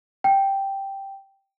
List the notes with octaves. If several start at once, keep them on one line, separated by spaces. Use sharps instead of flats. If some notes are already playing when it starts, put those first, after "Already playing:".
G5